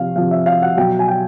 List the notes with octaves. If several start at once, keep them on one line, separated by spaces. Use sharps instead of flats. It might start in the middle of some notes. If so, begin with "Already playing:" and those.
Already playing: C3 F3 F5
C3 F3 F5
E5
F5
F#5
B2 F#3 G5
G#5
G5